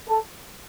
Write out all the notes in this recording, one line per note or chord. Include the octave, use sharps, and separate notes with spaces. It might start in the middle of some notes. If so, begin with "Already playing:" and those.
A4